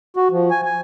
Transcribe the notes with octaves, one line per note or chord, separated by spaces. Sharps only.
F#4
F3
G#5
G#5